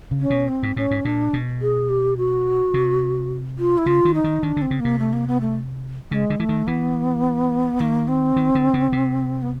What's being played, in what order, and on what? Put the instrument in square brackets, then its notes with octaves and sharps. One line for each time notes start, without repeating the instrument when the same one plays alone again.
[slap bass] C#3
[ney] C#4
[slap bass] B2
[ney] C4
[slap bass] G#2
[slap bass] A2 [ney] C#4
[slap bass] G#2
[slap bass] A#2 [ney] D4
[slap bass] B2
[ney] G#4
G4
F#4
[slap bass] C3
[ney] F4
E4
[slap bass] C#3 [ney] F4
[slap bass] D#3
[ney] D#4
[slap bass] D#3
[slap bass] D#3 [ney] D4
[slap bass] D3
[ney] C4
[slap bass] C#3
[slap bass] C3 [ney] A#3
[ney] A3
A#3
B3
A3
[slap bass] C#3 [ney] G#3
[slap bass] D3
[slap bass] E3 [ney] A3
[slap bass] D#3
[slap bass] E3 [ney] B3
[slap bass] D#3 [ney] A#3
[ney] C4
[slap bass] D#3
D3
C#3
C3
[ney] B3